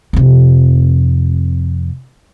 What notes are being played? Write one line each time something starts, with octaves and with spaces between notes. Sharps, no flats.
F2 C3